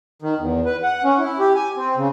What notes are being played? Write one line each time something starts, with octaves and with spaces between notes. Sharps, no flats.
D#3
E2
B4
F#5
C#4
E4
G4
G#5
C4
C#3